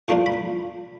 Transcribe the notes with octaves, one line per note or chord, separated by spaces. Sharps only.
A2 F3 A#3 D4 F4 C#6
B5